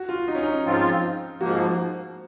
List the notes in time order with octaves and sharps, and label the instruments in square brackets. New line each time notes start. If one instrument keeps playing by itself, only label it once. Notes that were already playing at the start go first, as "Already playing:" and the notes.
Already playing: [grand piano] F#4
F4
D#4
C#4
D#4
[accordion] G#2 F3 C4 F4
[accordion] G#2 F3 A#3 [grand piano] F#4